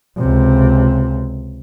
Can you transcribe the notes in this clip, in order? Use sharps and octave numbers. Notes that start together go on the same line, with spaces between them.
C#2 C3